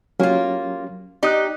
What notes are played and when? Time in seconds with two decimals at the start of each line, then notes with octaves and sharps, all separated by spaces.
0.20 F#3 A#3 C#4 F4 G4
1.23 D#4 G4 D5 D#6 F#6